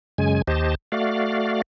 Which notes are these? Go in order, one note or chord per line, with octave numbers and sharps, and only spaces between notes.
F#2 C#3 G#3 G#5
D#2 G4 C5 D#5 A5
A3 F#4 D5 F5